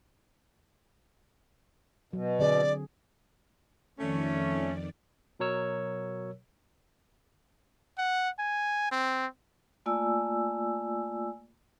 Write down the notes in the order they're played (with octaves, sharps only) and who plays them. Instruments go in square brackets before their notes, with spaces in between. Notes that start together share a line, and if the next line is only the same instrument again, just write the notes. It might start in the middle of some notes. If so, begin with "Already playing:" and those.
[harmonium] B2 [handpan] F#3
[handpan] D3 C4 G#4 [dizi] D5
[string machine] F2 D#3 D5 [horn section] A3 C#4
[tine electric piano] B2 F#3 A#4 C#5 E6
[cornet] F#5
G#5
C4
[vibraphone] A3 A#3 F4 D5 G#5 E6